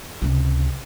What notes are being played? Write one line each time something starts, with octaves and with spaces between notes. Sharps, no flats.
C#2 C3